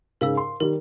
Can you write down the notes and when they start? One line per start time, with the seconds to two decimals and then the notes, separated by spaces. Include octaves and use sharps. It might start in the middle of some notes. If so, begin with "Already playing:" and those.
0.21 G#2 C#3 A#4 F5 E6
0.37 C6
0.60 D#3 G3 A#4